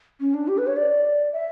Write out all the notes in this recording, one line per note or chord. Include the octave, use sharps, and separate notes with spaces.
C#4
D4
G4
B4
C#5
D5
E5